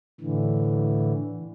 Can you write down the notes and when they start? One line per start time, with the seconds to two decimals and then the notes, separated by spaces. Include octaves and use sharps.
0.20 A2 D3 E3